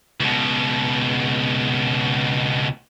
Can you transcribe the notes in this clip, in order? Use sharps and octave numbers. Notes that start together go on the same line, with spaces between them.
C#2 B2